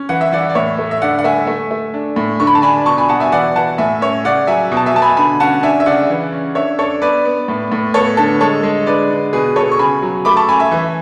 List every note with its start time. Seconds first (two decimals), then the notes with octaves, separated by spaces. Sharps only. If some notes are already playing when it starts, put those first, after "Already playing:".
Already playing: C#4
0.09 E3 F#5
0.21 E5
0.32 E3 D5 F#5
0.50 D5
0.55 A2 C#5 E5
0.78 A3
0.91 E5
1.01 D3 D5 F#5
1.19 F#5
1.24 A3 E5 G#5
1.47 A3
1.71 A3
1.94 D4
2.16 A2
2.40 D3 C#6
2.47 B5
2.55 A5
2.62 D4 G#5 B5
2.86 B2 A5 C#6
2.98 G#5 B5
3.09 B2 F#5 A5
3.20 E5 G#5
3.32 E3 D5 F#5
3.56 E3 F#5 A5
3.78 A2 E5 G#5
4.01 C#4 C#5 E5
4.24 C#3 D5 F#5
4.47 F#3 E5 G#5
4.72 B2
4.77 A5
4.86 E5 G#5
4.94 B2 A5
5.02 G#5 B5
5.17 D3 G#5 B5
5.40 C#4 F#5 A5
5.63 D4 E5 G#5
5.80 E5
5.86 C#3 D5 F#5
6.10 E3
6.32 C#4
6.55 D4 C#5 E5
6.79 D4 A4 C#5
7.02 B3 B4 D5
7.25 B3
7.48 A2
7.72 A2
7.94 B3 A4 C#5
8.17 D3 A4
8.40 G#3 A4 C#5
8.63 G#3
8.86 D3 B4 D5
9.10 D3
9.33 B2 G#4 B4
9.56 B2 A4 C#5
9.71 C#6
9.79 C#3 G#5 B5
10.02 F#3
10.25 A3 B5 D6
10.37 A5 C#6
10.48 C#4 G#5 B5
10.59 E5 G#5
10.72 E3